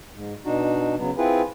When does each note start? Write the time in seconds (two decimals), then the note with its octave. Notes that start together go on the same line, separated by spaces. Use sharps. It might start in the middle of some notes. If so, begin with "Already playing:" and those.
0.14 G#2
0.45 B2 D4 D#4 F#4
0.98 C#3 F#3 B3
1.17 C4 E4 F4 G#4 B4